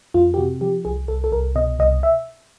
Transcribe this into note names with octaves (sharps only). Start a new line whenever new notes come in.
F2 F4
G4
C3 F#4
F3 G4
C2 G#4
C2 A4
A4
C2 A#4
B2 D#5
C2 D#5
E5